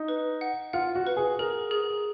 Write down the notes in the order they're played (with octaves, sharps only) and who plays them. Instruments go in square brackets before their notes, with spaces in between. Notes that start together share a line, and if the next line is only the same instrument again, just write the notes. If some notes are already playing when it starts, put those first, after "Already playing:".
Already playing: [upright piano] D#4
[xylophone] B4
F#5
[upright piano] F4 [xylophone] F#5
[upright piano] F#4
[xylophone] B4
[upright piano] G#4
[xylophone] G#4 [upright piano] A#4
[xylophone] G#4